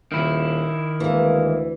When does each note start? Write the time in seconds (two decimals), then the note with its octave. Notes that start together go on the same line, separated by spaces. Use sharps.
0.12 D#1 D#3 E4
1.00 D2 E3 G#3 A#3